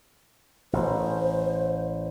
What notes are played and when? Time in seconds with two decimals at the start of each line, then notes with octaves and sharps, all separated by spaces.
0.73 A1 C5